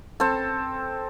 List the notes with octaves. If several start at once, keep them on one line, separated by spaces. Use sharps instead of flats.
C4 A4